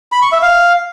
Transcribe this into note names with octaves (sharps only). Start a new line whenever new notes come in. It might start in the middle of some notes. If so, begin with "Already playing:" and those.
B5
C#6
E5
F5